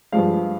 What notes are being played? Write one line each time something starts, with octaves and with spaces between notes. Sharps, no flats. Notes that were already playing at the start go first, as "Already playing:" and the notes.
G2 F3 G#3 F5